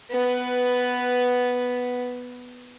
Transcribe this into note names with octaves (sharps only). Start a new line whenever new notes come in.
B3 B4